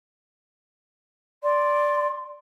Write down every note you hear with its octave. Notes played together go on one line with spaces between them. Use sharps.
D5 C6